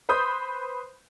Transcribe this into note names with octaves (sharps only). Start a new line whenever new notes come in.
B4 C5 B5 C6 D#6 G6